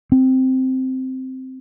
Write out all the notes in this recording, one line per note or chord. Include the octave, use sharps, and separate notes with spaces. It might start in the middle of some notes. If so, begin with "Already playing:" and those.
C4